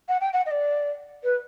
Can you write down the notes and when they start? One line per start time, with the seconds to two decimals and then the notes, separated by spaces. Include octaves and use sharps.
0.08 F#5
0.20 G5
0.33 F#5
0.46 D#5
0.51 D5
1.23 B4